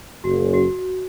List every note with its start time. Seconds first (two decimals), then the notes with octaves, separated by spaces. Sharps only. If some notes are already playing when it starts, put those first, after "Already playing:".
0.24 F#1 F#2 C#3 F#4
0.53 F#4